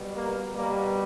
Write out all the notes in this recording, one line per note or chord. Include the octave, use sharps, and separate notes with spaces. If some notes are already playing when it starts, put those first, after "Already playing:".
Already playing: B2 G3
A#3
B2 G3 A#3